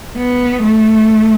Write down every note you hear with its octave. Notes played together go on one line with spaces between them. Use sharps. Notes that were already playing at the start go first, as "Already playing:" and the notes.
B3
A3